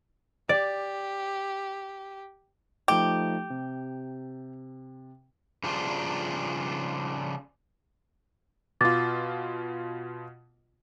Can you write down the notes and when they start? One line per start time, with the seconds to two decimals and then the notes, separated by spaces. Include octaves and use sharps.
0.49 G4 D5
2.88 F3 A3 D#4 G4
3.50 C3
5.64 C#3 F3 G3 D4 F4
8.81 B2 F4 D6 A6